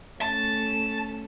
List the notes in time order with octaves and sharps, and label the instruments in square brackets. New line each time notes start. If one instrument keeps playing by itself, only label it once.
[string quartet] A3 C#4 A4 [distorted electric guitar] A5